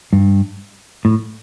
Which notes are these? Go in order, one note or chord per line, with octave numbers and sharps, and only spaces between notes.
G2
A2